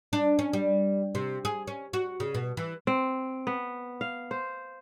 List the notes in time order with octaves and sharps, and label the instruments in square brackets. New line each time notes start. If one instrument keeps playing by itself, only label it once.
[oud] D4
C#4
G3
C3
G#4
C#4
F#4
C#3
B2
E3
[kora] C4
B3
F5
C5